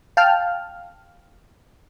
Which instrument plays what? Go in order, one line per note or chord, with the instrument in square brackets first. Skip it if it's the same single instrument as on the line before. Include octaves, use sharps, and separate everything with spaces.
[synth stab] F5 G5 A5 F6